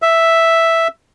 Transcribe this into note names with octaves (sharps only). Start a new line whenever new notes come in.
E5